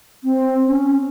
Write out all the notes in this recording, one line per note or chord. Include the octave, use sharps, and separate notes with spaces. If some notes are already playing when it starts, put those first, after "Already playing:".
C4
C#4